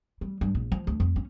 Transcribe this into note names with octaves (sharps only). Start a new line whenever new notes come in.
G3
G2
A#1
F3
D2
F2
C#4